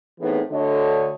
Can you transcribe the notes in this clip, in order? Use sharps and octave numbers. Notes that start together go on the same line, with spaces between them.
A2 E3 B3 C4 D#4 G#4
D2 D3 A4 C#5 D#5